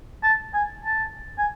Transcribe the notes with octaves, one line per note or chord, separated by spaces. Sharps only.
A5
G#5
A5
G#5